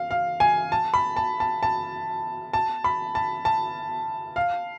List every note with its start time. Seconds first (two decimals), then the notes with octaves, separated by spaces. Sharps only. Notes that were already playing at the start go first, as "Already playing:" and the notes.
Already playing: F5
0.11 F5
0.40 G#5
0.72 A5
0.94 B5
1.16 A5
1.40 A5
1.63 A5
2.53 A5
2.84 B5
3.15 A5
3.45 A5
4.36 F5